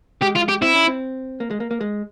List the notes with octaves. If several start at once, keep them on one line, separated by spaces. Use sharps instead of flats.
G#3 G4
F4
G4
C4 E4
C#4
C4
A#3
G#3
A#3
A#3
G#3